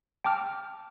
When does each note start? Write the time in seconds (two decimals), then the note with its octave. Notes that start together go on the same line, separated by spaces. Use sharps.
0.24 G5 A5 D6 F6